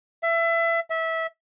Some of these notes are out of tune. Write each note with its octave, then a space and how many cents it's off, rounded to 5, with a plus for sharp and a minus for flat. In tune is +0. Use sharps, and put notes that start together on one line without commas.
E5 +25
E5 -20